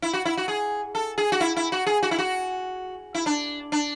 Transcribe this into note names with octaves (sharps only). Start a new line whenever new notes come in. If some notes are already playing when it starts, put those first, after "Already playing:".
E4
F#4
E4
F#4
G#4
A4
G#4
F#4
E4
E4
F#4
G#4
F#4
E4
F#4
E4
D4
D4